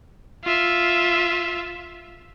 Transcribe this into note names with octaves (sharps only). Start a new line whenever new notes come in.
F4 E5